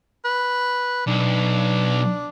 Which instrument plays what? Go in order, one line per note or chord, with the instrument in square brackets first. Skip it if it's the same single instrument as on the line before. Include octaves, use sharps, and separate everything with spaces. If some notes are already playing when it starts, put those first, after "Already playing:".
[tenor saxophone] B4
[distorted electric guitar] B1 [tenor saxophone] D4